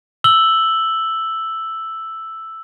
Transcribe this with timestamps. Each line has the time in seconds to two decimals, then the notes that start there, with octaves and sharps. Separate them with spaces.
0.24 E6 F#7 G7